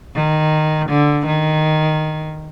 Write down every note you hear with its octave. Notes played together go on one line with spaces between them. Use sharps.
D#3
D3
D#3